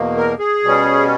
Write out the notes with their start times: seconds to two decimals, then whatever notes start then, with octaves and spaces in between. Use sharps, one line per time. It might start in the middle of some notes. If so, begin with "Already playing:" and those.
Already playing: E2 B2 A#3
0.17 A#4
0.39 G#4
0.63 B2 G3 C#4